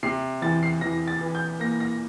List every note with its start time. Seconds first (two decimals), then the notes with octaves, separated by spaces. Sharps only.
0.03 C3 C7
0.42 E2 A6
0.63 C7
0.81 E2 A#6
1.08 A6
1.21 E3
1.35 G6
1.60 A#3 A#6
1.80 A#6